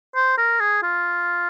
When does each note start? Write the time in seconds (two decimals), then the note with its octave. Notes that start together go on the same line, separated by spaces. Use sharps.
0.15 C5
0.38 A#4
0.60 G#4
0.83 F4